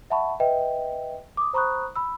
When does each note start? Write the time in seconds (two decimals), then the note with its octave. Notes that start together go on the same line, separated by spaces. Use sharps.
0.10 E5 F#5 A5 B5 C#6
0.40 B4 D#5 E5 G5
1.37 D6 D#6
1.53 C5 A#5 B5 C#6 D#6 F#6
1.96 B5 E6